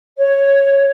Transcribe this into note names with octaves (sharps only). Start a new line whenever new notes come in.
C#5